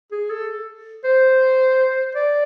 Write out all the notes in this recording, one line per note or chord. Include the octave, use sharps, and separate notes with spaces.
G#4
A4
C5
D5